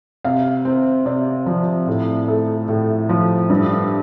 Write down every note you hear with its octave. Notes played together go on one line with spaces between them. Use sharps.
C3 F5
C4
C3 D5
F3
A2
A3
A2
F3
G2